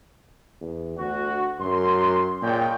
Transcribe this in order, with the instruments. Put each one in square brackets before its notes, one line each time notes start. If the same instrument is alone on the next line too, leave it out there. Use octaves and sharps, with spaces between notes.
[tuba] E2
[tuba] D2 [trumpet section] F#4
[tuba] F#2 [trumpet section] C6
[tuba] A#2 [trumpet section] G#3 C#4 G5